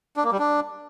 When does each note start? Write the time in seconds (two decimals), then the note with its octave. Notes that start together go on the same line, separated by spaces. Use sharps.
0.16 D4
0.24 A#3
0.31 G3
0.39 D4